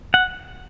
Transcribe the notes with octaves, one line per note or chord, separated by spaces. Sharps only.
F#5